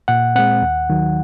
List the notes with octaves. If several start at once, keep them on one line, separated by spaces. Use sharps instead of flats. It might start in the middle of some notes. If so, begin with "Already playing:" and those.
A#2 F#5
G#3 C4 F#5
D#2
D#3 F#3